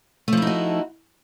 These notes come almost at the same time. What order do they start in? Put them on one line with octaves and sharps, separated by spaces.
A3 F3 E4 D#4 F#4